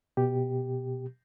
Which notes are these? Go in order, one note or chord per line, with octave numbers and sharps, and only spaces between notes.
B2 G4